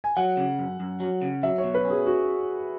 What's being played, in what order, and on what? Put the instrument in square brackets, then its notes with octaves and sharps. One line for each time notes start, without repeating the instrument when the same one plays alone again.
[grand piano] G#5
[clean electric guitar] F#3 [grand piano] F#5
[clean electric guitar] C#3
F#2
F#2
F#3
C#3
[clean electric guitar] F#3 [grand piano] E5
[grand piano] C#5
[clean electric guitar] B2
[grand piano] B4
[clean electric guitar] C#4
[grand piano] G#4
F#4